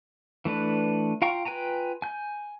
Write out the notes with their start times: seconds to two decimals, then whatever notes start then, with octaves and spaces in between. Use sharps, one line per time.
0.45 E3 A3 D4 B4
1.22 F4 F5 G5 A#5 C#6
1.45 F4 B4 G5 G#5 A#5
2.02 G#5 G6